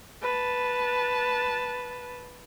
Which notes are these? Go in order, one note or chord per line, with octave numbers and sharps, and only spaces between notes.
B4 A5